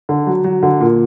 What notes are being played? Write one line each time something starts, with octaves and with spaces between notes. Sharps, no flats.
D3
F#3
F#3
D3
A#2